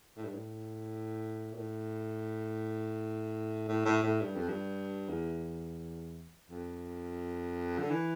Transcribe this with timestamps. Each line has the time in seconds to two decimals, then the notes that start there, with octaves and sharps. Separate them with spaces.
0.17 A2
0.25 G2
0.34 A2
1.52 A#2
1.57 A2
3.69 A2
3.85 A2
4.03 A2
4.21 G2
4.35 F2
4.49 G2
5.08 E2
6.50 F2
7.79 D3
7.91 E3